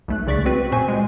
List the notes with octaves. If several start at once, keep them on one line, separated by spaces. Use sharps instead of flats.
B1 A3 F#6
C#2 C#3 D5 C#6 A6 B6
C4 F#4 B4
A#2 C4 C5 G#5 C#6
G#3